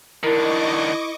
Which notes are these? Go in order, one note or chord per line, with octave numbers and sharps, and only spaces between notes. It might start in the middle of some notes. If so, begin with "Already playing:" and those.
D#3 D4 E4 A#4 D#5 C#6 D6